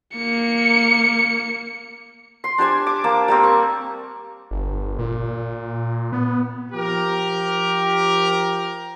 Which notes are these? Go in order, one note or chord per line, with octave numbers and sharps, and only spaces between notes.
A#3 C#7
C6
D4 G4 C5 G#5
D6
A#3 A5 D6
G3 A#3 C4
C#6
G1
A#2
B3
F3 G4 A#4